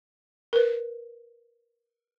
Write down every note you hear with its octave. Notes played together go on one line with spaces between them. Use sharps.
A#4 B4